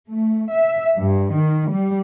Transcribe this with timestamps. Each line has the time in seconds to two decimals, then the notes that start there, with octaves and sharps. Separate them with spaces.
0.11 A3
0.54 E5
0.97 G2
1.33 D#3
1.72 G3